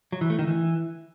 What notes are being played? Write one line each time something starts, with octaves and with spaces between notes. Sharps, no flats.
F#3
E3
A3
D#3
E3